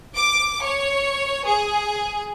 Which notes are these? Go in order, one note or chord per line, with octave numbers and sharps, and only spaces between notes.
D6
C#5
G#4